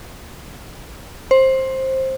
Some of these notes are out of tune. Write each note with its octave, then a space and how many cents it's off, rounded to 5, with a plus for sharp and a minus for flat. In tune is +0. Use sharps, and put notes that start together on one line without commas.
C5 +15